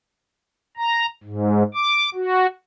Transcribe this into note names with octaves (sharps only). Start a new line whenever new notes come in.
A#5
G#2
D6
F#4